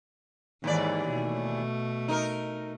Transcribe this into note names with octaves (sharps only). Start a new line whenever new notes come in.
D#2 G#2 E3 D5
B2 A3
D#4 A#4